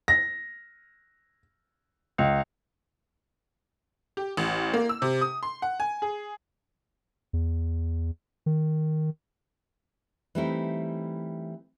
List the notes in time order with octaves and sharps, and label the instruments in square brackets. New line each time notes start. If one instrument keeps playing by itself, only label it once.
[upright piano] A#6
C#2
[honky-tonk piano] G4
A1
A#3
E6
C3
D#6
C6
F#5
G#5
G#4
[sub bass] E2
D#3
[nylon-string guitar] E3 G3 A3 C4 D#4 E4